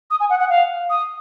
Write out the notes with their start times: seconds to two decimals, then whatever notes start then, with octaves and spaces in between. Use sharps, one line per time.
0.10 D#6
0.20 G#5
0.30 F#5
0.40 F#5
0.49 F5
0.90 D#6